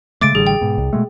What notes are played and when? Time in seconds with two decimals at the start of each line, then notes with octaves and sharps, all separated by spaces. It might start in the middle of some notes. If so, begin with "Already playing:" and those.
0.21 C#3 G#3 A3 D6 A6 D7
0.35 A1 D3 G3 G#4
0.47 G5
0.61 G#2 B2
0.78 C2
0.93 B2 G#3 A3